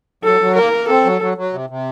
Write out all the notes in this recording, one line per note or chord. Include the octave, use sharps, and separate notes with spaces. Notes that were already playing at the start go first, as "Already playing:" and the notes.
F#3 A4
F#3
A#3 A#4
A#3
C4 A4
F#3
F#3
F#3
C3
C3